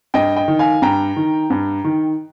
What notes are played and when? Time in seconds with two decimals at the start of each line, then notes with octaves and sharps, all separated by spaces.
0.14 G2 D#5 G5
0.36 D#5 G5
0.48 D#3
0.59 F5 G#5
0.82 G2 G5 A#5
1.16 D#3
1.50 G2
1.84 D#3